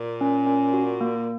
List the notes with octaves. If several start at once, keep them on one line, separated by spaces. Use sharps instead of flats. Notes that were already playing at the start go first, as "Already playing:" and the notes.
Already playing: A#2
C#4
C#4
F#4
A#3